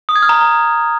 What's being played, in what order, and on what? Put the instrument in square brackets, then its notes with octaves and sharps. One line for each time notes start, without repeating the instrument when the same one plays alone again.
[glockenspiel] D#6
G#6
F6
A#5